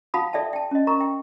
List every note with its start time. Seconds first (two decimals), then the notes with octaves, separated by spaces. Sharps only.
0.14 F4 F5 F#5 A5 B5 D#6
0.33 A4 D5 E5 G5 A5
0.53 G5 A5
0.71 C#4 D#5
0.87 A#4 A#5 C#6
1.00 G5